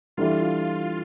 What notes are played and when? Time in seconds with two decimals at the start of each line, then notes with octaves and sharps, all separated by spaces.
0.17 E3 G3 D4 F4 A4 E5